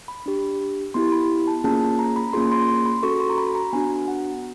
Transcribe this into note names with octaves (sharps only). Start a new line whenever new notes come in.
B5
D4 G4
B3 E4 G4 C6
B5
A5
A#3 C#4 F4 G#4 A5
A#5
B5
A#3 C#4 F4 G#4 C6
C6
C6
B5
C#4 F#4 A4 C#6
C6
A#5
B5
A#5
B3 D4 F#4 G#5
F#5